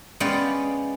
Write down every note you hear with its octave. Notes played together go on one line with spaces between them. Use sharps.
G#3 B3 C#4 D5 F5 G5